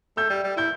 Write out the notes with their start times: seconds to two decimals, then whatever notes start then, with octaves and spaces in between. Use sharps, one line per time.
0.17 A3 E6 G6
0.30 G3
0.44 G3
0.56 E4 G6